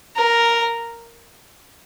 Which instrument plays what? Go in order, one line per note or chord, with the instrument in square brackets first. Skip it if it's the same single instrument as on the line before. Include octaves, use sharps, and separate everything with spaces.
[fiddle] A#4